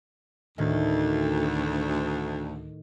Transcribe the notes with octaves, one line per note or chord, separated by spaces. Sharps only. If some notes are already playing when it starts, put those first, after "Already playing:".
D2 A2 D#3